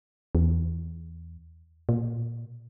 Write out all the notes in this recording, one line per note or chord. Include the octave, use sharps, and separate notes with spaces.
E2
A#2